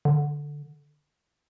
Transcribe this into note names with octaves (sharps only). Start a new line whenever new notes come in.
D3